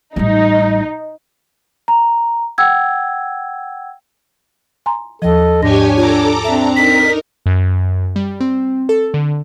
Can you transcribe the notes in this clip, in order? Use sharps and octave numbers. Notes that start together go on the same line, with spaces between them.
A1 G3 D#4
A#5
F#5 G5 E6 G#6
G#5 A#5 C6
D#2 F3 A4 D#5
G#2 D4 G4 C#5 G#5 A#6
F4 A4 C#5 A#5 D6
C4 D4 E5 A#5
D#4 A#4 B6
F#2
G3
C4
A4
D3